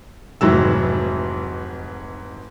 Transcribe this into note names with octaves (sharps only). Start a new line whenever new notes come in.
F1 G#2 E3 F#3 E6